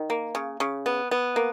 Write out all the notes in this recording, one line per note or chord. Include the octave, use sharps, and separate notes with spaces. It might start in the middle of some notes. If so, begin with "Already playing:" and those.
Already playing: D#3
A#3
C#3
C#3
B3
B3
A#3